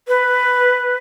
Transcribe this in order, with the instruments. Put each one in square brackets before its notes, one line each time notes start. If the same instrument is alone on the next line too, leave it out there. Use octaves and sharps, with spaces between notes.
[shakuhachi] B4